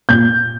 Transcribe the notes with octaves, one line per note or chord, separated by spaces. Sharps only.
A#2 G6